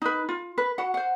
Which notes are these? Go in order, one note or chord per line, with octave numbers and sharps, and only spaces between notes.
D#4 B4
F4
B4
F#4 F#5
C5 F#5